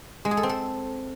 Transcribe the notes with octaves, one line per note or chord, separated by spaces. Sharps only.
G#3
G#4
A4
C4
A4